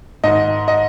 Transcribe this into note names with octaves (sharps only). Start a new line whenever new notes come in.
G#2 D#3 D#5
D#5